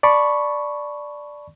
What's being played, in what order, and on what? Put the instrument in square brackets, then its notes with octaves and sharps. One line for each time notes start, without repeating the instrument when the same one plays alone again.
[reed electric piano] D5 A5 B5 C#6